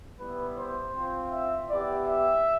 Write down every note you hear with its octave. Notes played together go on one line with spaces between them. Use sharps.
G3 B3 E4 B4
C5
C4 F4
E5
B3 E4 G4 D5
E5